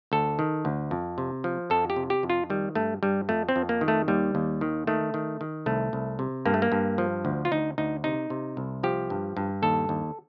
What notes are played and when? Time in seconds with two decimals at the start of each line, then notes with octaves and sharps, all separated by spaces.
0.12 D2 A4
0.39 D#3
0.65 D2
0.91 F2
1.18 C3
1.44 F3
1.70 F2 A4
1.90 G4
1.96 C3
2.10 G4
2.23 F2
2.30 F4
2.50 D#3 G3
2.75 G2 A3
3.03 G2 G3
3.29 F2 A3
3.49 C4
3.56 F2
3.69 A#3
3.81 D#3
3.88 A3
4.08 D#2 G3
4.35 D#2
4.61 D#3
4.87 D#3 A3
5.14 D#3
5.41 D#3
5.66 C2 A3
5.93 C2
6.19 C3
6.46 G2 A#3
6.54 A3
6.62 A#3
6.72 G2
6.98 F3
7.25 D2
7.45 F4
7.51 D2 D#4
7.78 D2 D#4
8.04 C3 D#4
8.30 C3
8.57 C2
8.83 F3 G4
9.10 G2
9.37 G2
9.62 D#2 A4
9.89 D#2